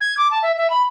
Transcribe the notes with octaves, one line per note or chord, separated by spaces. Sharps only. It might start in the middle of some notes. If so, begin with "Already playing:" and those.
G#6
D6
A5
E5
E5
B5